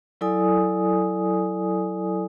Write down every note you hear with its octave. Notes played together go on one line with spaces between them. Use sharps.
F#3 E4 A4 D5 G#5 D#6